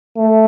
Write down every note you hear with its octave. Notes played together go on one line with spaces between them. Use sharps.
A3